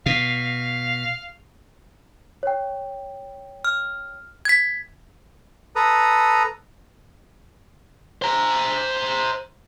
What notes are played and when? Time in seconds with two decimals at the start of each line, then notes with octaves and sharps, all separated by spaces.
0.06 B2 F5
2.43 C#5 G5
3.65 F6
4.45 G#6 B6
5.76 A4 B4 A#5 D#6
8.22 C5 A#5